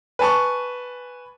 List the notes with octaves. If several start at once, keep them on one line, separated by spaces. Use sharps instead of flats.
B4 G#5 A5 C#6